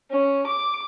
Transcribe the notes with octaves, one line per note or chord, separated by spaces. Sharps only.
C#4
D6